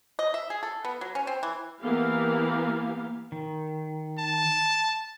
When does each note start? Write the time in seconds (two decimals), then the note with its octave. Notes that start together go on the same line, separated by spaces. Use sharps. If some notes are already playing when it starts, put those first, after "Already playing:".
0.19 D#5
0.34 E5
0.50 G#4
0.63 A4
0.85 B3
1.01 F#3
1.15 C#4
1.27 C4
1.43 E3
1.81 E3 A#3 B3 G4 F5
3.32 D#3
4.18 A5